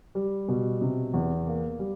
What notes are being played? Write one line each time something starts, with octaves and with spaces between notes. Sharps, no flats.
G3
B2
C3
E2
A#3
G3